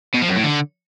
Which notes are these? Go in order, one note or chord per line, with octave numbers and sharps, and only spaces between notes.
B2
F3
F#2
A2
D3